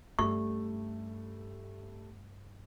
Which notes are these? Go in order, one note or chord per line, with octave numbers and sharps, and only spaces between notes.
G2 G3 A3 C#4 C#6